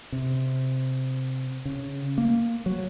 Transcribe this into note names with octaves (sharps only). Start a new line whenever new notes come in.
C3
C#3
A#3
F#3